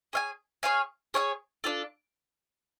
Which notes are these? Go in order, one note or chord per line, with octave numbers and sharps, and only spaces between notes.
G#4 C#5 F5 G#5
G#4 C#5 F5 G#5
G#4 C#5 F5 G#5
D4 F4 A4